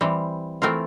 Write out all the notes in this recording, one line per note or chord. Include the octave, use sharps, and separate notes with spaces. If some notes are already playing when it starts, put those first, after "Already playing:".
E3 G3 C4
E3 A3 C4 F4 A#4